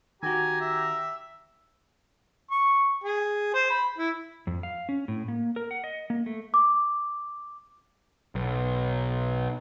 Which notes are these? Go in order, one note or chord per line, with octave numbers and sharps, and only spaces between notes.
D#3 F#4 G4 G#5 A#5
E5
C#6
G#4
C5
B5
E4
F2
F5
C#4
A2
A#3
A#4
F#5
D#5
A#3
A3
D6
B1